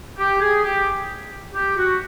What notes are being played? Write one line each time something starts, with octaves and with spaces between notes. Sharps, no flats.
G4
G#4
G4
G4
F#4